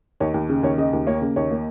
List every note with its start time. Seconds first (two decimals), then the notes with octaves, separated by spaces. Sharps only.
0.20 D#2 C#5
0.34 D#2
0.49 C#3
0.63 D#2 C#5
0.78 C#3 D#5
0.93 D#2
1.07 A#3 C#5
1.22 C#3
1.36 D#2 C#5
1.51 A#3